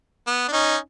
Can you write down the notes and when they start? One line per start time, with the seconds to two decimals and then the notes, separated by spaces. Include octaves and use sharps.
0.27 B3
0.48 D4
0.52 C#4 D#4